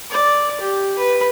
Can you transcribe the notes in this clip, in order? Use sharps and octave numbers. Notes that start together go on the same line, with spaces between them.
D5
G4
B4